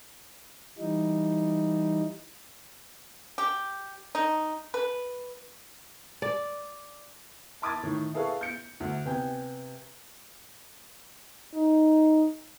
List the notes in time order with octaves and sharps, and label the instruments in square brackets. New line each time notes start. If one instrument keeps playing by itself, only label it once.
[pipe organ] E3 G3 D#4
[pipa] G4
D#4
B4
[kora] D5
[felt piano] A5 B5 D6 D#6 G#6 A6
A2 D#3
E4 G#4 A4 B4 F5 C#6
G6 C#7
D2
C3 B3 G5 G#5 G6
[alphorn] D#4